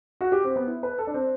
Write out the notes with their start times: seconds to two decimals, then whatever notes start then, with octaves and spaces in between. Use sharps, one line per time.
0.21 F#4
0.32 G4
0.44 C4
0.56 B3
0.67 E4
0.83 B4
0.98 A4
1.07 D4
1.14 C4